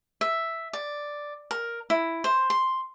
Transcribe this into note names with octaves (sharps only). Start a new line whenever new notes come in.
E5
D5
A#4
E4
C5
C6